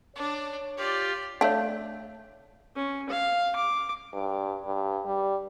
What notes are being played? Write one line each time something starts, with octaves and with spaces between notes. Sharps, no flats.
D4 C#5
F4 G4 D5
A3 D4 C#5 F5
C#4
F5
D6
G2
G2
G3